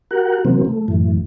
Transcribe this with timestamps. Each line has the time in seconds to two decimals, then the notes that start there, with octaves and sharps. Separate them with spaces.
0.11 F#4 G4 A#4 F#5
0.45 C3 E3 F#3 A#3 C4
0.65 A3
0.88 F#2 A2 E3